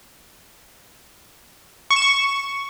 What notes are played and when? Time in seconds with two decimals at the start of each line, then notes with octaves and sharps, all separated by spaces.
1.91 C#6
1.96 E7
2.02 C#6